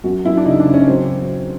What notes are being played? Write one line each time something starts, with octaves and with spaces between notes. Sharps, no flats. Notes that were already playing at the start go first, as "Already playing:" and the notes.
F#2 F#4
F#2 E4
D4
C#3 D#4
D4
C#3
C#4
F#3 C4